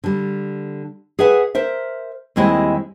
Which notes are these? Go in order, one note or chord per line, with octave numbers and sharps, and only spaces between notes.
D3 G3
G#4 B4 E5 F#5
A#4 C5 E5
D#2 G3 G#3 C4 E4 D#5